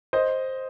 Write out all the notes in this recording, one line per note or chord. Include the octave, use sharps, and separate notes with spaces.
C5 D#5